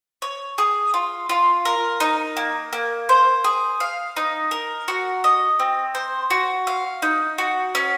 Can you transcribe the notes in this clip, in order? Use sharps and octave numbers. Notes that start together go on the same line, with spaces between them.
C#5
G#4
F4
F4
A#4
D#4
A#3
A#3
C5
G#4
F5
D#4
A#4
F#4
D#5
C4
C5
F#4
F5
D#4
F#4
C#4